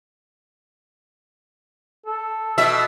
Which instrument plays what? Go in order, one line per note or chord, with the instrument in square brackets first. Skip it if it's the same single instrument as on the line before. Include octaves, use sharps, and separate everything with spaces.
[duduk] A4
[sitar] B2 E5